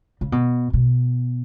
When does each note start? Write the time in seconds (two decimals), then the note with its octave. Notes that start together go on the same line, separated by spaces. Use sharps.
0.21 C#3
0.32 B2
0.73 B2